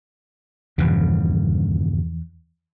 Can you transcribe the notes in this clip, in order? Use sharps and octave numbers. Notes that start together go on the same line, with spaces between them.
D#1 E2 G2 C#3 E3 F3